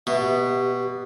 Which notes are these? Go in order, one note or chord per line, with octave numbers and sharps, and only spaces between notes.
B2 E5
G4